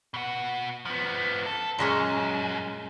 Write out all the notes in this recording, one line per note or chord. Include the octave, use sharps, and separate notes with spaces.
B2 F#5
F3 B3
A4
F#2 A#2 G#3 C#4